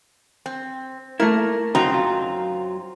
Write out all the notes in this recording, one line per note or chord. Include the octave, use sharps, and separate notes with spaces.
C4
A3 A#3 E4 A#4
F#2 C#3 C4 D#4 F#4 A#5
F#3 F4